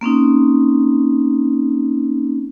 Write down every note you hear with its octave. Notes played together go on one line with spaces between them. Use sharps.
A#3 C4 C#4 D#4